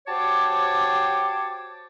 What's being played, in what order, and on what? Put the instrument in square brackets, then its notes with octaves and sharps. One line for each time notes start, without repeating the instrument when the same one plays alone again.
[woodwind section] F#4 G4 C5 C#5 A5 D6